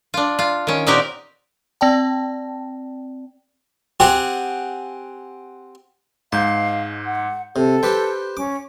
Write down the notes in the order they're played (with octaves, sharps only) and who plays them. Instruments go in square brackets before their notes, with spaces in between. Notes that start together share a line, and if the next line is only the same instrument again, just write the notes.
[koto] D4 F4
F4
D#3 C#4
A#2 C4 D#4 F#4 G4 A#4
[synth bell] C4 D5 G5 A5
[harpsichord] C4 G4 G#4 F#5
[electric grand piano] G#2 G#3 G6 [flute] F5 [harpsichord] A5
[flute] F#5
[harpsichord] C3 [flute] A4
[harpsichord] G4 B4 G5 [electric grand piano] C5
[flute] C#4 [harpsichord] D6